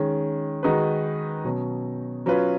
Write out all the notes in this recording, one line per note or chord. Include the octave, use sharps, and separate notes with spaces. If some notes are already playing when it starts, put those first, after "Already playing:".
Already playing: D#3 G#3 C#4
D#3 G#3 D#4 F#4 B4
B2 F#3 C#4
F#3 C#4 F4 B4